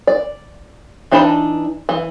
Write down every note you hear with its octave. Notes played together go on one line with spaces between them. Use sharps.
D5
E3 D4 D#4 A5 B5
E3